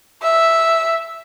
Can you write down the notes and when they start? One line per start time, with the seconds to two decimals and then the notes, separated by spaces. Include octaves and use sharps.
0.23 E5